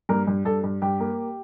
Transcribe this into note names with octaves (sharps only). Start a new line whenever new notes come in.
G2 A#3 A#4
G2
G2 A4
G2
G2 G4
A#3